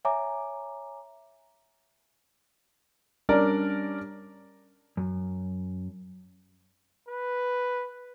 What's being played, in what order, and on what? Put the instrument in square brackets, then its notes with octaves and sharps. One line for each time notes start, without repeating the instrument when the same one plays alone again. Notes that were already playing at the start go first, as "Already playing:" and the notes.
[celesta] C#5 E5 G#5 A#5 D6
[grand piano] G3 C#4 D4 A#4 D5
[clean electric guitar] F#2
[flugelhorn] B4